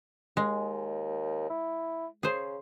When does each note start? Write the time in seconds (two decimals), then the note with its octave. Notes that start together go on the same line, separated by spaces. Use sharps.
0.37 D#2 G#3
1.50 E4
2.23 C#3 G#4 C5